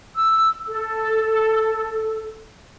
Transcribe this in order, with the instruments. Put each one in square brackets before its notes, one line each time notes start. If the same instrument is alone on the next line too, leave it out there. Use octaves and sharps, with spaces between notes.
[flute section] E6
A4